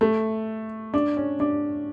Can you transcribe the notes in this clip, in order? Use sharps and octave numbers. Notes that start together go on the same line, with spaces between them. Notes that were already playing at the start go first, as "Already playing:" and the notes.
A3
D4
C#4
D4